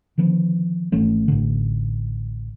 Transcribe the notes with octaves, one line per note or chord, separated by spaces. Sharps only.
D3 D#3 F3 B3
G#1 E3 A3 C#4
A1 A2 D3